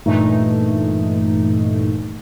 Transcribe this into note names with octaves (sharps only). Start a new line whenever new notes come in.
G2 A#2 E3 A3 D#4